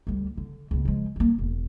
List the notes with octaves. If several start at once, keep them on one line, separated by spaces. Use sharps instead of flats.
D2 G3
D3
C#2 A#2
F3 G#3
G3 A#3
E1